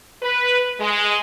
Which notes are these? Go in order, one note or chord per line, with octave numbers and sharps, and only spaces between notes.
B4
G#3